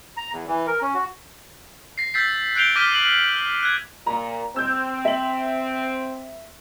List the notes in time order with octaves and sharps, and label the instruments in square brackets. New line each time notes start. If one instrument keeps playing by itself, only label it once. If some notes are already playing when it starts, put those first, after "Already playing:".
[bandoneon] A#5
E2
E3
A#4
C#4
F#4
[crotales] A#6 C7
E6 G6 A6 B6 C7
F#6 G6 C7 D7 F7 G7
D6 F6 G6 A#6 B6 D#7
F#7
F#6 G#6
[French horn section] A#2 [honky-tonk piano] A#5
[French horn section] C4 [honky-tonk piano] E6 G6
[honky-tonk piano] E5 F#7